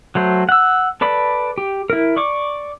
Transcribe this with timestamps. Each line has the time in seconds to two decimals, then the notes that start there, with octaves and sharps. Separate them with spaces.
0.15 F#3 A3 C5
0.49 F#5 E6
1.01 A4 B4 D5 B5
1.58 G4
1.90 E4 A#4
2.16 D5 C#6 D6